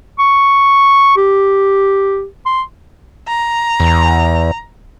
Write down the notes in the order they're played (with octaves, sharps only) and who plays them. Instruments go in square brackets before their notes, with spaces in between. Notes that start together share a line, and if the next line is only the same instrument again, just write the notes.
[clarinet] C#6
G4
C6
[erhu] A#5
[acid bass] E2